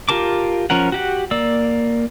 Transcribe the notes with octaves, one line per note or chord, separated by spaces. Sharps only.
F4 G4 A#4 A5 D6
F3 C#4 A#4 F#5
F#4 G4 F#5
A#3 D5 E6